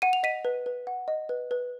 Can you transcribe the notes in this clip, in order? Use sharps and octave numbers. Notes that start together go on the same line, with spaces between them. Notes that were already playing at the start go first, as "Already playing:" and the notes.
F#5 D#7
F7
D#5 B6 D#7
B4
B4
F#5
D#5
B4
B4